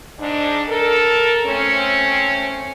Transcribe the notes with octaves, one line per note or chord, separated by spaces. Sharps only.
G#2 D4
A4 A#4
A3 C4 C#4